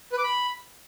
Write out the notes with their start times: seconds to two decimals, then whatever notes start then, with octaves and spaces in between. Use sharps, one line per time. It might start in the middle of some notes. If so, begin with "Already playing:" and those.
0.13 B4
0.18 D6
0.23 B5